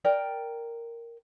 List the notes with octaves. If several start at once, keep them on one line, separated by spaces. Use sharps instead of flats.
A#4 D5 G5